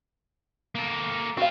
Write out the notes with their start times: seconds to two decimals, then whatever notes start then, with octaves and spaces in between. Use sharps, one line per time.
0.75 A#3 A4
1.37 C4 F4 F#4 F5